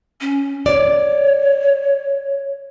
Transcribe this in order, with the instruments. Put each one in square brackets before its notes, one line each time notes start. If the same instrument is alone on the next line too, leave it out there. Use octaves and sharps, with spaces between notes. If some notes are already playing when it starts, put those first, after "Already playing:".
[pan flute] C#4
[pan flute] C#5 [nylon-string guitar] D5